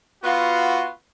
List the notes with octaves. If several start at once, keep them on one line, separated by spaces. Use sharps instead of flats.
B3 F4 F#4